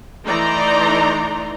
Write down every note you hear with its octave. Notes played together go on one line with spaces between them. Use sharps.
E3 A3 D#4 D5 A#5 C6